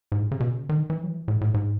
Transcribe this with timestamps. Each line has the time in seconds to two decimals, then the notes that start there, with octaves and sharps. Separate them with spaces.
0.12 G#2
0.21 A2
0.31 C#3
0.40 B2
0.50 C#3
0.69 D#3
0.90 E3
1.04 F#3
1.09 E3
1.28 A2
1.41 A2
1.54 G#2